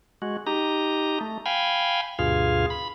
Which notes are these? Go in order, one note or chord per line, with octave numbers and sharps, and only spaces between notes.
G#3 F#4
D#4 G4 A#5
A3
F5 G5 G#5 B5
D2 G2 B2 F4 G#4 F5
B5